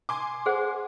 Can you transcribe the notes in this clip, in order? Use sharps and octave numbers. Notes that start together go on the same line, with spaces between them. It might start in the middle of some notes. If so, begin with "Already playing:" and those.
G#5 C6 D6
G#4 C5 F#5